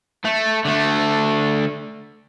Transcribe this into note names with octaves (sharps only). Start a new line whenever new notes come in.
A3
D3 A3